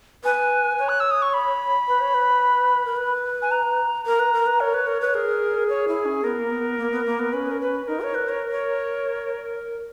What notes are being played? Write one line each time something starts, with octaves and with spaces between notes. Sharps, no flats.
B4 G#5
C#5
F#6
E6
D#6
C#6
B5
B4
C#5
B4
A#4
B4
G#5
A#5
A#4 A#5
B4
A#4
B4
A#4 C#5
B4
A#4
B4
G#4 A#4
C#5
E4
C#4
B3 A#4
A#3
B3
A#3
B3
A#3
B3
C#4 B4
A#4
B4
D#4 A#4
C#5
B4
C#5
C#5